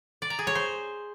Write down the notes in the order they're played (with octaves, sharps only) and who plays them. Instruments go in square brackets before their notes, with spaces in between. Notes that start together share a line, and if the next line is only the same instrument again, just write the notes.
[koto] D5
A#5
G#4
C#5
C5